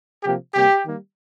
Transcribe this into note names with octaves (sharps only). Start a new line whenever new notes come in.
C3 F3 A#3 G4
C3 G3 A#3 G4
D#3 G3 A#3